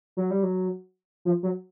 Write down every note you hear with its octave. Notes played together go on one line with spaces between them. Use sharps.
F#3
G3
F#3
F3
F#3